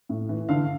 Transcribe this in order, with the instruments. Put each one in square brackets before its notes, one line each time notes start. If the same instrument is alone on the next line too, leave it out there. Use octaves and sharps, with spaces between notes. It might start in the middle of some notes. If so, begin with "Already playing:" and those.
[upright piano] A2
E3
D3 F5